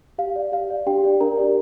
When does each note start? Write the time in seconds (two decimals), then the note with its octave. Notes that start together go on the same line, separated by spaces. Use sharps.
0.18 G4 F5
0.36 D5
0.52 G4 F5
0.70 D5
0.87 D4 G4 G5
1.03 G4 D5
1.21 D4 A#4 A#5
1.38 G4 D5